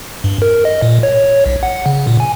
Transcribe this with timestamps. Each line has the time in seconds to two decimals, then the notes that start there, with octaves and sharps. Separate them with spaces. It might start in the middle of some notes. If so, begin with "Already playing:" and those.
0.24 G2
0.42 A#4
0.65 D#5
0.82 A#2
1.03 C#5
1.46 B1
1.63 F#5
1.86 C#3
2.07 A#2
2.20 G#5